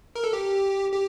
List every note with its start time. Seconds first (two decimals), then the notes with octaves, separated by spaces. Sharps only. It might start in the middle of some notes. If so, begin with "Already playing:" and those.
0.15 A#4
0.24 A4
0.33 G4
0.92 G4